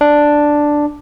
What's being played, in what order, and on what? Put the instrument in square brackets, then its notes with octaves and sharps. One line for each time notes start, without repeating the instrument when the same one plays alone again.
[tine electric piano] D4